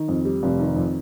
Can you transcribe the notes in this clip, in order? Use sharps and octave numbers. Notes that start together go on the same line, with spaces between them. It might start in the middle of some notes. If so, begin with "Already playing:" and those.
Already playing: D#3
F2
G3
F1
D#3
F2